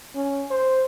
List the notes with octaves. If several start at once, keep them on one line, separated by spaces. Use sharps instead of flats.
C#4
C5